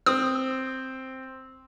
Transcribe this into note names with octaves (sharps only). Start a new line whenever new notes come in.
C4 D#6